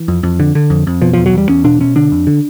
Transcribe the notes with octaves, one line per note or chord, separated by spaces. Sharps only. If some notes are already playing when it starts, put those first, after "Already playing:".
Already playing: E3
F2
F2
D3
D3
F2
F2
B2 F3
E2 F3
F#3
E2 G3
E2 C#4
B2 D4
B2 C#4
D3 D4
F2
D3